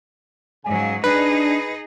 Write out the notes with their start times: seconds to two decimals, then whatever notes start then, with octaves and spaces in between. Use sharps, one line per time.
0.65 G#2 C#3 F#3 F5 G#5
1.04 D4 D#4 G#4 B4